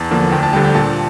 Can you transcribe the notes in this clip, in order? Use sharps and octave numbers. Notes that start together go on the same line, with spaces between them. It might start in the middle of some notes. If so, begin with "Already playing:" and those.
Already playing: E2 A5
D3 F3 A#3
D2 G5
A5
D3 G3 G5
G5
A#2 A5